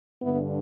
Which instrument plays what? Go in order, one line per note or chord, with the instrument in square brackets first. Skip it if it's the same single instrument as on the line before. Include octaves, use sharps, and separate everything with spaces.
[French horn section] G2 D3 B3 E4